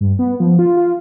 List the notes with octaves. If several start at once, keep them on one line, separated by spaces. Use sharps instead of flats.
G2
B3
F3
F4
F4